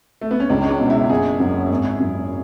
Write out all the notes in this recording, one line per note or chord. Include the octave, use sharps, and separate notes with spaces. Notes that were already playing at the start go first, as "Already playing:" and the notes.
A3
B3
C#4
C#2 D4
C#4
D4
B2
E4
F#1 G#4
F#2
G#1
F#2